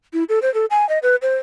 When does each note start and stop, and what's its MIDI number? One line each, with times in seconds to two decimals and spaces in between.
0.13 0.24 64
0.29 0.39 69
0.42 0.52 72
0.54 0.66 69
0.71 0.87 80
0.89 0.99 75
1.03 1.16 71
1.22 1.36 72